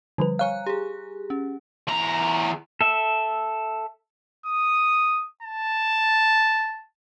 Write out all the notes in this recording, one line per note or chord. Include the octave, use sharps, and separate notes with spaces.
D3 F3 G3 B4
C#5 F5 G#5 A#5 F#6
G4 G#4
C#4
E2 A#5
A4 E5
D#6
A5